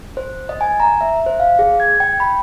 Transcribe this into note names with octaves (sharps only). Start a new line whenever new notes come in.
C5
D#5
G#5
A#5
E5
C5
F5
G#4
G#6
G5
B5